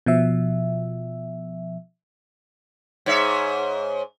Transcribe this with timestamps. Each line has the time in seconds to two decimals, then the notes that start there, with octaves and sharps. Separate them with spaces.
0.06 B2 F3 E5
3.06 G#2 C#5 E5